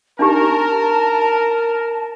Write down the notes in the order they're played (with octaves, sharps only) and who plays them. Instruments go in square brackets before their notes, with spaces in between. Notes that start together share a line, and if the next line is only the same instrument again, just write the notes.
[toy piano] D4 D#4 G4 [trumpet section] A#4 [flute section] A5